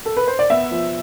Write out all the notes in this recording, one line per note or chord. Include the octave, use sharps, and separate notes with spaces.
A4
B4
C5
D5
B3 E5
F3